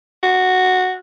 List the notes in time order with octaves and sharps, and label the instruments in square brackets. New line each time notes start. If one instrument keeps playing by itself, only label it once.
[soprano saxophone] F#4